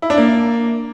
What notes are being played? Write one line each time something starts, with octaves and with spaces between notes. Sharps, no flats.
E4
D4
A#3